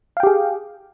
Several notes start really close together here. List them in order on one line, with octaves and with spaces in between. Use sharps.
F5 G5 G4 G#4